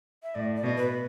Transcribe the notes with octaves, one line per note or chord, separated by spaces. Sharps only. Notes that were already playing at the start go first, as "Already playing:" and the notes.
E5
A2 D5
D5
B2
B4